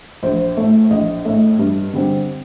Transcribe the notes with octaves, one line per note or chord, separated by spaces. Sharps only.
A#1 C5
A2 A3
A#1 D#5
A2 A3
G2
D3 G3 C4